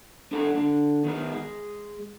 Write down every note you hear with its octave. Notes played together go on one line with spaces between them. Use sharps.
D4 A4 F#5 A#5
D3 D4
D#3 B3 A#4
G#3